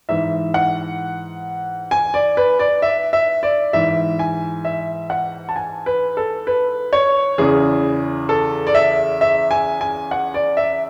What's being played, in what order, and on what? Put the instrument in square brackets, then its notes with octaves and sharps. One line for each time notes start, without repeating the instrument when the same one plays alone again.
[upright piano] G#2 E3 E5
F#5
G#5
D5
B4
D5
E5
E5
D5
G#2 E3 E5
G#5
E5
F#5
A5
G#5
B4
A4
B4
C#5
E2 C#3 E3 G#4
A4
D5
E5
E5
G#5
G#5
F#5
D5
E5